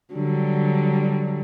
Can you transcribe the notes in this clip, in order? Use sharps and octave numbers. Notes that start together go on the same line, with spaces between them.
D3 F#3 G3